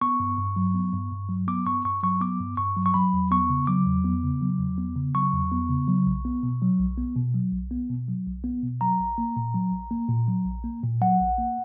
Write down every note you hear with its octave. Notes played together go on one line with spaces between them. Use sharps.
B3 C#6
G2
G2
F#3
B3
G2
G2
F#3
B3 D6
G2 C#6
G2 C#6
F#3 C#6
B3 D6
G2
G2 C#6
F#3
C#6
F#3 B5
E2
B3 C#6
C#3
F#3 D6
E2
B3
C#3
F#3
E2
B3
C#3
F#3 C#6
E2
B3
C#3
F#3
B1
B3
B2
F#3
B1
B3
B2
F#3
B1
B3
B2
F#3
B1
B3
B2
F#3 A#5
A#1
A#3
A#2
F#3
A#1
A#3
A#2
F#3
A#1
A#3
A#2
F#3 F#5
A#1
A#3